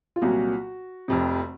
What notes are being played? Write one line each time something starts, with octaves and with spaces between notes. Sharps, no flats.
F4
C2 A#2 F#3 F#4
F1 F2 C3